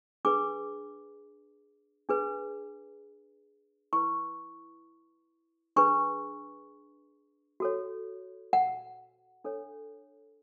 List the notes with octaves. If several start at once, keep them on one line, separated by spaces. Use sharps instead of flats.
D4 G#4 B4 D6
D4 G#4 B4
E4 B4 C#6
D4 G#4 B4 C#6
F#4 A4 C#5
F#5
D4 A4 C#5